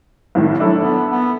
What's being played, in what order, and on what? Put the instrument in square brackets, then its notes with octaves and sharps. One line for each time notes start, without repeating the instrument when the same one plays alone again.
[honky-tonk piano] C2 A2 D#3
[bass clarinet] F#3 [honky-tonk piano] D4 E4 A4
[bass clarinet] B3
B3